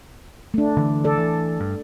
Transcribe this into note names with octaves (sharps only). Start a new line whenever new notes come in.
A3 D4
D3 E3
A4 D5
E3
G2